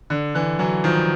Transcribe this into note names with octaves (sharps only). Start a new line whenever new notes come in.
D3
D3 E3
E3 F#3
D#3 F3